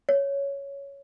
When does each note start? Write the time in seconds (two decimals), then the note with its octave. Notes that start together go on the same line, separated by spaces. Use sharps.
0.09 C#5